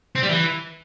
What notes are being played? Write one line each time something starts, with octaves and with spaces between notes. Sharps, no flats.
C4
G3
E3